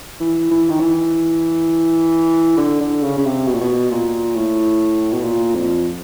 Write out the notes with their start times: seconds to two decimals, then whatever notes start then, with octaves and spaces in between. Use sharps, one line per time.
0.21 E3
0.51 E3
0.70 D#3
0.80 E3
2.57 D3
2.81 D3
3.03 C#3
3.18 C#3
3.25 C3
3.47 B2
3.54 A#2
3.61 B2
3.91 A#2
4.35 A2
5.13 B2
5.24 A#2
5.55 F2